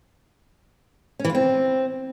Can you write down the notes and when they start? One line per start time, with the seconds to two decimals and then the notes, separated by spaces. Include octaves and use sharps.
1.19 C#4
1.25 E3
1.30 F4
1.35 C4